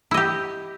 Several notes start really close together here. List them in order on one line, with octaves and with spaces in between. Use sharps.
E4 D#5 G4